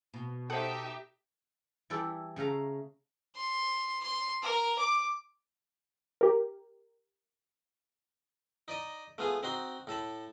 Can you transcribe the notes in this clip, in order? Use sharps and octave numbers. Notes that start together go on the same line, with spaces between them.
B2
D#4 G4 A4 C5 D5 E5 F#5 D#6
E3 G3 E4 A4 D5
C#3 A3 F5 A#5
C6
C6
A#4
D6
G4 A#4
D#4 D5 D#5
A3 B3 F4 G#4
C4 D#4 F#4 C6
A2 A4 A5 B5